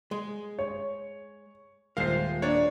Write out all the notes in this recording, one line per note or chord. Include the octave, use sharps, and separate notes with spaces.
G#3
C#5
D#1 G#3 F4 A#4 C5 F5 C7
A#3 D4 C#5 D5